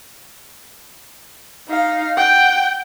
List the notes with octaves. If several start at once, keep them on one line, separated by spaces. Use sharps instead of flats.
D#4 F5
F#5 G5